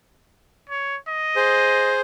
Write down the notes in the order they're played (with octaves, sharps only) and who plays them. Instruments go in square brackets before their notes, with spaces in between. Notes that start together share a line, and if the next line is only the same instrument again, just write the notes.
[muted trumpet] C#5
D#5
[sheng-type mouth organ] G#4 C5